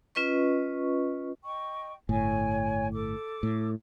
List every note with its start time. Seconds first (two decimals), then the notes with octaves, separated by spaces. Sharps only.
0.15 C#4 F4 B4 D#5 C#6
1.43 D#5 G5 C#6
2.09 G1 A2 C#5 G5 G#5
2.93 A4 D6
3.43 A2